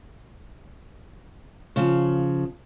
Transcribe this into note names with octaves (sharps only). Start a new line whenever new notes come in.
C#3 F3